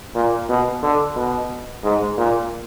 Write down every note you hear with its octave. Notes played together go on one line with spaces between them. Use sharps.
A#2
B2
D3
B2
G#2
A#2